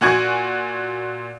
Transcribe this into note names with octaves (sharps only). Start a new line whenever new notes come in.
A#2 F#4 G#5 C#6 G#6